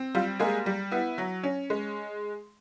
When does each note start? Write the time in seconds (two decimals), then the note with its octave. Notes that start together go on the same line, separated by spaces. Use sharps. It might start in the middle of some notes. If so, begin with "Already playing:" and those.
Already playing: C4
0.15 G3 F4
0.40 G#3 A#3 G#4
0.66 G3
0.92 B3 E4
1.18 F#3
1.43 C#4
1.70 G#3